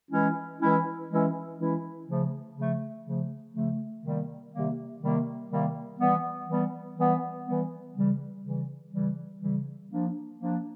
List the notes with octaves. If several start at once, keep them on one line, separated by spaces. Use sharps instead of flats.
E3 G#3 C#4 E4
E3 G#3 C#4 E4
E3 G#3 C#4 E4
E3 G#3 C#4 E4
C#3 F3 A3
C#3 F3 A3
C#3 F3 A3
C#3 F3 A3
C3 D#3 G3 A#3
C3 D#3 G3 A#3
C3 D#3 G3 A#3
C3 D#3 G3 A#3
E3 G3 B3
E3 G3 B3
E3 G3 B3
E3 G3 B3
C#3 E3 G3
C#3 E3 G3
C#3 E3 G3
C#3 E3 G3
F3 A#3 D4
F3 A#3 D4